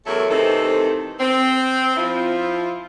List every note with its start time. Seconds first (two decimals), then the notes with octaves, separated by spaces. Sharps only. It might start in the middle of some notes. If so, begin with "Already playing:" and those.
0.06 E2 F#3 A3 A4 A#4 E5
0.29 C3 D#3 E3 A3 C4 A4
1.20 C4
1.96 F3 E4 F4